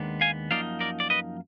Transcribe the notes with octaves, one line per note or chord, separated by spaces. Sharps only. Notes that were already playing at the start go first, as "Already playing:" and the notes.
Already playing: D#2 D#3 G#3 B3 D4
F5 G#5
F#2 F3 A#3 D#4 D5 F5
A#4 D5
D5
B4 D#5